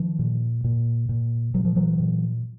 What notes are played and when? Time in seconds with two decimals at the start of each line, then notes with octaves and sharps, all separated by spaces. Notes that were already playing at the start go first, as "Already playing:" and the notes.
Already playing: D#3 F3
0.19 A#2
0.64 A#2
1.09 A#2
1.54 A#2 F#3
1.65 F3
1.76 E3 F#3
1.99 A#2